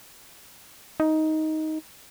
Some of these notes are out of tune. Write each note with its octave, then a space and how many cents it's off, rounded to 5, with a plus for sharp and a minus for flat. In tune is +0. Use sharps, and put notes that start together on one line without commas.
D#4 +10